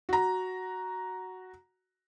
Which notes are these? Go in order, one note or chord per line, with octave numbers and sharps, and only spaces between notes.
F#4 A#5